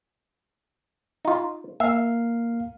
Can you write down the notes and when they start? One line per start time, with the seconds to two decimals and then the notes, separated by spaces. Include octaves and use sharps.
1.25 D#4 F4
1.80 A#3 E5 F5